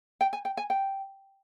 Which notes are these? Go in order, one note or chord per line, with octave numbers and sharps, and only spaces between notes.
G5
G#5
G5
G#5
G5